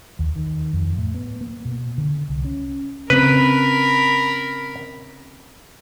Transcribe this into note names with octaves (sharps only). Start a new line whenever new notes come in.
D#2
D#3
F2
A2
B3
A#3
B2
D3
C2
C#4
C#3 C4 A#4 B4 B5